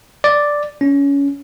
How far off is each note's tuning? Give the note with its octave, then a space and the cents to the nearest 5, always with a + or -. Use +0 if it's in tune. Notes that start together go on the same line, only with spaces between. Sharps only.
D5 +0
C#4 +20